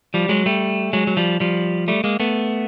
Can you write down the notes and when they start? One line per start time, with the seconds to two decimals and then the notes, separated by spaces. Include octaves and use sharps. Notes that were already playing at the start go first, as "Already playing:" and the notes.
0.14 F3 G3
0.29 F#3 G#3
0.46 G3 A3
0.93 F#3 G#3
1.07 F#3
1.17 F3 G3
1.40 F3 G3
1.88 G3 A3
2.04 G#3 A#3
2.20 A3 B3